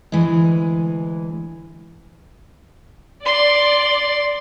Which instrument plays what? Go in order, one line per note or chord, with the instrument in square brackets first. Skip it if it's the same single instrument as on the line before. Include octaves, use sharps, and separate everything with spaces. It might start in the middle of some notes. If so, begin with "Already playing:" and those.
[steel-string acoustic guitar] D2 E3 G#3
[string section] D5 [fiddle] C6